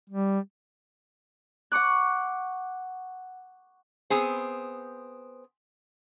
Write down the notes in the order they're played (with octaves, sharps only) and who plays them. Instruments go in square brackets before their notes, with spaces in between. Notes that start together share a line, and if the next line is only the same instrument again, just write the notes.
[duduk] G3
[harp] F#5 C#6 D6 F#6
[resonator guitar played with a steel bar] B3 C4 G#4 C5